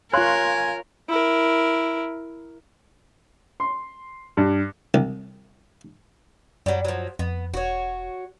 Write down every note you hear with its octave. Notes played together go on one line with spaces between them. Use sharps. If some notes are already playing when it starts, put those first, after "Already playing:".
F4 A#4 C#5 F5 G#5 C6 F#6
E4 A#4
C6
G2
C2
F#2 F#3 G3
F3 F#3
F2 B3
E1 F#4 C#5